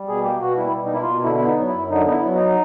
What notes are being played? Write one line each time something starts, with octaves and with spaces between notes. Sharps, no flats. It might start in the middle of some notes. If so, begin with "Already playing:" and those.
Already playing: G3
B2 G#4
A#3 G4
B2 F#4
G3 E4
B2
D#4
A#3 E4
F4
B2
D3 E4
B3 E4
D#4
F#3
E4
F#2
D3 D#4
B3 D#4
E4
F#3
D#4